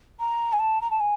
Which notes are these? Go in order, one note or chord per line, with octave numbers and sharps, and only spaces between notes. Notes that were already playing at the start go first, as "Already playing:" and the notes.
A#5
G#5
A5
A#5
A5
G#5